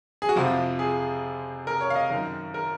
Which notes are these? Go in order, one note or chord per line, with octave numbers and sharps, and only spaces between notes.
G#4
F#4
F2 C3 F3 F4
G#4
A#4
C#5
F5
D#5
F#2 D#3 A#4
A#4